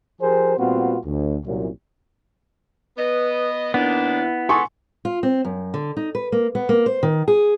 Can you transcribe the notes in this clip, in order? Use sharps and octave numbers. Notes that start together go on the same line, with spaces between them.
F3 G4 G#4 A#4 C5
A#2 G3 B3 C4 F4 F#4
D2
C2 F#2 A#2
B3 B4 D#5
D#2 B3 D4 E4
G#4 A4 G#5 C6 C#6
F4
C4
F#2
D3
D#4
B4
A#3
B3
A#3
C5
D#3
G#4